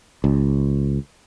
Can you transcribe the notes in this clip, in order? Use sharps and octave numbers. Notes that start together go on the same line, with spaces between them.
C#2